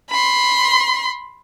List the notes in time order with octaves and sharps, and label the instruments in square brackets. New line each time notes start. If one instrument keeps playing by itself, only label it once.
[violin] B5 C6